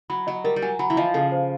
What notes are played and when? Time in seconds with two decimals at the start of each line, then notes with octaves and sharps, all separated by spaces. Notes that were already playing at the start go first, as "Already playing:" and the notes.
0.10 F#3 B5
0.27 F#3 D#5
0.44 G3 A#4
0.56 G3
0.62 F#3 G#5
0.79 F#3 B5
0.90 E3
0.97 F3 D#5
1.14 C#3 A4
1.32 C5